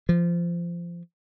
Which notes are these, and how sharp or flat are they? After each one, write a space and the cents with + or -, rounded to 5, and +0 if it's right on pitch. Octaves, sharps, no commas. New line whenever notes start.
F3 -20